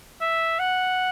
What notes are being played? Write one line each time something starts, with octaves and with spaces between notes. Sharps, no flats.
E5
F#5